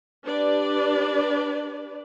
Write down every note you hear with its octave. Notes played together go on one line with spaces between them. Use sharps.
D4 G4 B4 D5